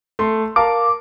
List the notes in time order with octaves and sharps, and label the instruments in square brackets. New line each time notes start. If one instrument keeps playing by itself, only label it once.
[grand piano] A3 C6
[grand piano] A#4 F5 A5 [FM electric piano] D6